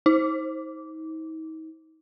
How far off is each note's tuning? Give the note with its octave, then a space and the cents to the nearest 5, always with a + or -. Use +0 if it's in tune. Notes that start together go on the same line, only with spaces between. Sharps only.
D#4 +40